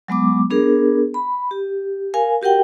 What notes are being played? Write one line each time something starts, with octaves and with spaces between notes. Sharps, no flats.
F#3 G#3 B3 D6
B3 D4 G#4 A#4
B5
G4
A#4 F5 G#5
F#4 G4 A#4 F#5 G5